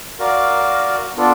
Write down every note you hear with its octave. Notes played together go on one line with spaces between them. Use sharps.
F#4 A#4 D5 F5
B3 D4 F4 A4 D5